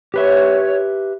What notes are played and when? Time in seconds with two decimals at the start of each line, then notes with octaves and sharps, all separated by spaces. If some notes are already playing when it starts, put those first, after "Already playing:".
0.14 G4 B4 C#5 E5